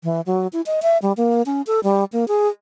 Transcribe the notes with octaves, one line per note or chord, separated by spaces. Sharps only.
E3
F#3
E4
D#5
E5
G3
A#3
C#4
A4
G3
A#3
G#4